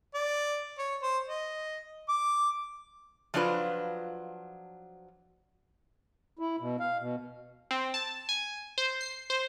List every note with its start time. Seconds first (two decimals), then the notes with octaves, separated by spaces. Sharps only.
0.14 D5
0.78 C#5
1.02 C5
1.28 D#5
2.09 D6
3.34 F3 F#3 D4 F4 B4
6.39 E4
6.60 B2
6.80 F5
6.99 B2
7.71 C4
7.94 A5
8.29 G#5
8.78 C5
9.01 C7
9.30 C5